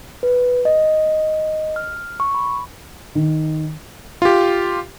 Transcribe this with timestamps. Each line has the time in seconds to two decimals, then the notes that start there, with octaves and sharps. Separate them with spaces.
0.23 B4
0.65 D#5
1.76 F6
2.20 C#6
2.35 B5
3.15 D#3
4.22 F4 G4